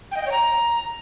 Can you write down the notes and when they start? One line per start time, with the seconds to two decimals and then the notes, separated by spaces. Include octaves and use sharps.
0.11 G5
0.16 D#5
0.21 G5
0.26 C#5
0.32 A#5